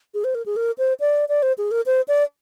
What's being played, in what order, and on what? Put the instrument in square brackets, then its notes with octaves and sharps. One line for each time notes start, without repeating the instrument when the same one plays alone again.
[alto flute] G#4
C5
A#4
G#4
A#4
C5
D5
D5
C5
G#4
A#4
C5
D5